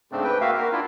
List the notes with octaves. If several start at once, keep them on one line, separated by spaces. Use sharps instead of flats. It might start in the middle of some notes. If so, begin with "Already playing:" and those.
G#2 C#3 A3 C4 D4
B4 G5
A#3 F#4 E5 F5
A#4
D4 E4 F4